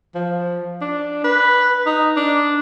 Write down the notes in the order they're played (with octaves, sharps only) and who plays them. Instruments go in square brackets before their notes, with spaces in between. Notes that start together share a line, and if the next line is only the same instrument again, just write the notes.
[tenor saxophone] F3
D4
B4
D#4
D4